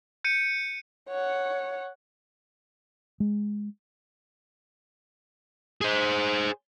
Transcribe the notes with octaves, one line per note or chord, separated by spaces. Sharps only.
G6 C#7 D#7
C#5 F#5
G#3
G#4 C5